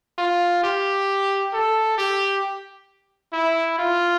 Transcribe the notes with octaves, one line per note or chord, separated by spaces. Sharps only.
F4
G4
A4
G4
E4
F4